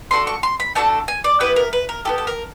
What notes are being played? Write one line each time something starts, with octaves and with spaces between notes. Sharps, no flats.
A3 D4 F#4 A4 C6
C#6
C6
B5
A3 D4 F#4 A4 A5
G#5
D5
B3 E4 G4 B4
A#4
B4
A#4
B3 E4 G4 A4
A4
A#4